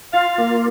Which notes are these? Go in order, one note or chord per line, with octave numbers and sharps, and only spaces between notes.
F4 F5
A#3